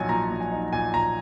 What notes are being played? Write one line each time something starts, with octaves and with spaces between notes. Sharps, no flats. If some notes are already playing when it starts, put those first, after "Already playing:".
Already playing: A#1 F#3 D#4 C#5 F#5 G#5
A#2 A#5
A#1
G#5
D#4
A#2 G#5
A#2 A#5